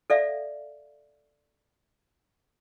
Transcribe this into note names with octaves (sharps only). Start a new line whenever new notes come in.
A4 D5 E5 F5